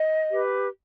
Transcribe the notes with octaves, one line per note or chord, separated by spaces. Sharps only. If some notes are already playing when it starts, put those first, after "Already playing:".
Already playing: D#5
G4 B4